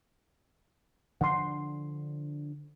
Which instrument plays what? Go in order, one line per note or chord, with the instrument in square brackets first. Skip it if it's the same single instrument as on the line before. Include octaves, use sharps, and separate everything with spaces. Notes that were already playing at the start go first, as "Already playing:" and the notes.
[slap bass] D3 F3 D4 [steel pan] F#5 C6